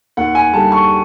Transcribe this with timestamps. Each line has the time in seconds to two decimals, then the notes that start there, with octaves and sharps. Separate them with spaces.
0.17 D#2 F#5
0.35 G#5
0.53 D3 G3 A5
0.72 C#6